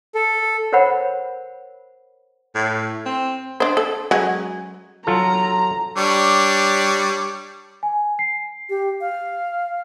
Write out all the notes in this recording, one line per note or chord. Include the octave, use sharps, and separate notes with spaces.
A4
A#4 C5 C#5 F#5 B5
A2
C4
D4 C5
A4
F#3 G#3 C#4
F#3 F4 A4 A#5
G3 D4 C#5
G#5
C7
G4
F5